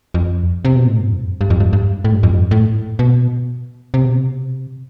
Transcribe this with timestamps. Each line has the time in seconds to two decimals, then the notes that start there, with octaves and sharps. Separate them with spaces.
0.14 F2
0.65 C3
0.76 B2
0.87 A2
0.99 G2
1.10 F2
1.41 G2
1.50 F2
1.60 G2
1.73 G2
2.04 A2
2.13 G2
2.23 F2
2.33 G2
2.51 A2
2.99 B2
3.94 C3
4.06 B2
4.17 C3